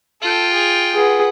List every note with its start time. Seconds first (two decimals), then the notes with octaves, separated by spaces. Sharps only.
0.22 F4 A4 G5
0.54 G#4 F7
0.94 G#4 B4 F#5